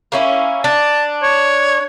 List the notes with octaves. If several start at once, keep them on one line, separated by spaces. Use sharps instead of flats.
A#3 C#4 E4
D4 A5
C#5